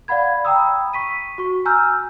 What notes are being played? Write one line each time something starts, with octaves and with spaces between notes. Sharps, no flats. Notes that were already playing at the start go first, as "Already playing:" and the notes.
D5 F5 F#5 B5 G#6
G5 A#5 B5 D#6 E6
C#6 B6 D#7
F#4 C#6
G#5 A#5 E6 F6 G6